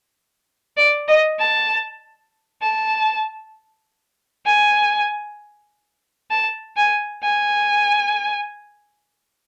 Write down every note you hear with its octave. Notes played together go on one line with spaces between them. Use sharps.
D5
D#5
A5
A5
G#5
A5
G#5
G#5